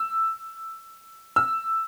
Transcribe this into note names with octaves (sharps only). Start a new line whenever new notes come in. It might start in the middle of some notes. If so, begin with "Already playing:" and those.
Already playing: E6
E6